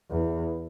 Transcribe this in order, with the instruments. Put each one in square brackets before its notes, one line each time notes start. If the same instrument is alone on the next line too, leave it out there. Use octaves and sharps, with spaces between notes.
[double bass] E2